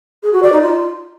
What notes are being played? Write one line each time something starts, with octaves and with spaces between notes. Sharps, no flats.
G#4
F#4
D5
D#4
F4